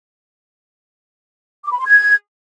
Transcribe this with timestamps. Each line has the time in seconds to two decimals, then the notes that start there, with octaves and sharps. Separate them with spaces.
1.65 D6
1.72 B5
1.79 C6
1.86 G#6